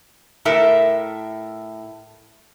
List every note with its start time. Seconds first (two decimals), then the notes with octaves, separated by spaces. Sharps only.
0.45 A2 A4 A#4 E5